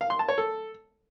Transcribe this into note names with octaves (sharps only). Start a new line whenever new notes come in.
F5
C6
A5
C#5
A4